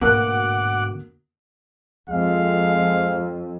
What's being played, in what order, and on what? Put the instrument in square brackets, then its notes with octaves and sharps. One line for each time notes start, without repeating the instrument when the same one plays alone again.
[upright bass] A1 G#2 [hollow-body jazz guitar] D2 B2 [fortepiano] A#3 F#6 [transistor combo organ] F#5 D6
[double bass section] F2 [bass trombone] G#3 [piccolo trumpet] F5